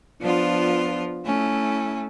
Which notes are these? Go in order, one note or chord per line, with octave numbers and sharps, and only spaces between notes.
F3 B3 D4 F4
A3 C#4 E4